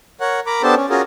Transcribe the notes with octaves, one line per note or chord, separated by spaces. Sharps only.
A#4 C#5 F#5
A#4 A#5 B5 D6
B3 D4 G4 A4 C5 A5
C#4
C#4 F4 F#4 G#4 A#4